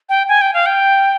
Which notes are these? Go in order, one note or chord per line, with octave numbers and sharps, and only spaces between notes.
G5
G#5
G5
F5
G5